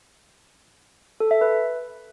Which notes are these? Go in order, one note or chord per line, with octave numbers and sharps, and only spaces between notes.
A4
E5
B4